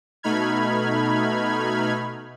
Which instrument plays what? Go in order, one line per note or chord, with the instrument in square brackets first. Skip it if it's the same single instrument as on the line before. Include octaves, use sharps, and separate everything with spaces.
[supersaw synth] B2 A3 D#4 B5 F6 G#6